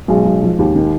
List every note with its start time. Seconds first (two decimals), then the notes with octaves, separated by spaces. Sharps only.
0.08 B1 G#3
0.25 B1
0.43 F3
0.59 D#2
0.75 D#3